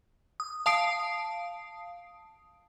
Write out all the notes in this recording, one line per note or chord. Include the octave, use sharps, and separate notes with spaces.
D#6
F5 A5 D#6 C7 D7